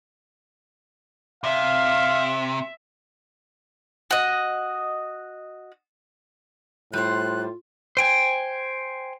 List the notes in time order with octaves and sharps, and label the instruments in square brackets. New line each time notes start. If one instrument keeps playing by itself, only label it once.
[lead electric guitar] C3 [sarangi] E5 [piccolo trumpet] F5
[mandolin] F#4 D#5
[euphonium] A2 [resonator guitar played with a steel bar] G3 C5 [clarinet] F4 [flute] F#6
[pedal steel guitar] C5 G5 G#5